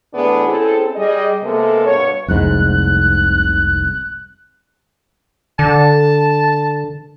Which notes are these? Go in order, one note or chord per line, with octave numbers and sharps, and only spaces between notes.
A2 E3 B3 D4 G#4
C4 C#4 E4 G#4 A4
G3 G#4 D#5
C3 G#3 A#3 B3 A4
G2 B2 C#5
F1 C2 G#2 F#6
D3 A5